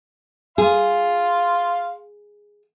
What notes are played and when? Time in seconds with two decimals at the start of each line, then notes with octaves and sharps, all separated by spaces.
0.58 G#4 F5 C6